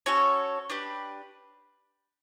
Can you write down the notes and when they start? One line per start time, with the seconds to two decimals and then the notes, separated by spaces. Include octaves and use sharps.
0.06 C#4 F#4 A4 C#5
0.70 D4 G4 B4